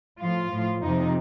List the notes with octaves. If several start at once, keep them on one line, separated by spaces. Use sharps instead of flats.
A2 F3 F4
A2 F3
F2 C3 F3 D#4